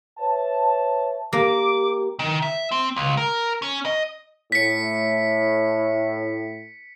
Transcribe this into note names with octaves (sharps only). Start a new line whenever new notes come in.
B4 C#5 E5 A5
A#3 G4 D6
D#3
E5
C4
C#2
A#4
C#4
D#5
A2 B6 C#7